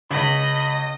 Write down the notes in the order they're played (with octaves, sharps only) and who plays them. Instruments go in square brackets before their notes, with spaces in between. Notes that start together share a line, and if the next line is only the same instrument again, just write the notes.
[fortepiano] C#2 [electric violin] D#5 [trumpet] B5